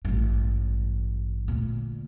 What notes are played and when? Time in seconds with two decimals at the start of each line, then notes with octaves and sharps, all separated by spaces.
0.05 A1 G2
1.48 D2 A#2